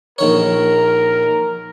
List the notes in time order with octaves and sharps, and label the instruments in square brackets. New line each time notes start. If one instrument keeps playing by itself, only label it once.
[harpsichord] A#1 D#3 C#5 [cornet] A#4